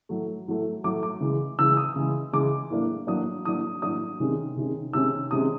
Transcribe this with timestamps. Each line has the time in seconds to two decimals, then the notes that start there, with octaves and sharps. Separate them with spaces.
0.09 A2 F#3 A3
0.47 A2 F#3 A3
0.84 A2 F#3 A3 D6
1.03 D6
1.20 C#3 E3 G#3
1.59 C#3 E3 G#3 E6
1.77 D#6
1.96 C#3 E3 G#3
2.33 C#3 E3 G#3 D6
2.70 A2 F#3 A#3 D4
3.07 A2 F#3 A#3 D4 D#6
3.45 A2 F#3 A#3 D4 D#6
3.82 A2 F#3 A#3 D4 D#6
4.20 C3 D#3 G#3 C#4
4.56 C3 D#3 G#3 C#4
4.93 C3 D#3 G#3 C#4 E6
5.31 C3 D#3 G#3 C#4 D#6